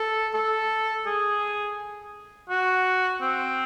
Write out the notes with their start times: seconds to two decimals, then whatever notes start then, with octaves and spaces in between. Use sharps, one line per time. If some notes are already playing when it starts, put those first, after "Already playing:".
Already playing: A4
0.34 A4
1.06 G#4
2.49 F#4
3.21 C4